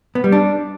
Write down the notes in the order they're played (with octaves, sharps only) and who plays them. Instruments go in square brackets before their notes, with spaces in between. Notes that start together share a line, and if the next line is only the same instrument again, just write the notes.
[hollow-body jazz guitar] B3
G3
D4